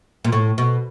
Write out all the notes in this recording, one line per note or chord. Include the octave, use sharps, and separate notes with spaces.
A#2
A2
B2